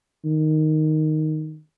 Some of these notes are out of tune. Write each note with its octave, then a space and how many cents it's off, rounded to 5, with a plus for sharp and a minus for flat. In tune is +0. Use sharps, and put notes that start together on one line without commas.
D#3 -5